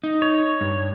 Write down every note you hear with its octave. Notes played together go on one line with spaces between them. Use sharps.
D#4
C#5
G2